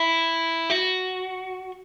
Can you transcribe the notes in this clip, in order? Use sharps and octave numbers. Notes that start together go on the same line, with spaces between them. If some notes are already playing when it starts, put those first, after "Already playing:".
Already playing: E4
F#4